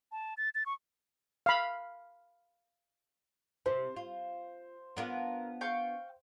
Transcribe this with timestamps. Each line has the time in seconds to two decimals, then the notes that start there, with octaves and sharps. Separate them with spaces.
0.12 A5
0.37 A6
0.55 A6
0.66 C#6
1.46 F5 B5
3.66 C3 C5
3.96 F4
4.97 B3 D4 F4 A#4
5.61 F5 G5 C#6